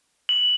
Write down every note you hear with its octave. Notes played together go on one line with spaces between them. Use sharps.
F#7